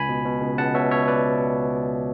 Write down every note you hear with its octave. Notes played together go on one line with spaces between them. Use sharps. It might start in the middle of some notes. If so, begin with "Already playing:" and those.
Already playing: C#2 G#5 B5
B2
B2
C#2
C#2 F#5 A5
B2 C#5 E5
B2 C#5 E5
B4 D5